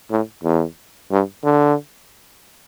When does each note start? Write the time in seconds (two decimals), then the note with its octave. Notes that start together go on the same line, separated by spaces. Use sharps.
0.10 A2
0.44 E2
1.11 G2
1.44 D3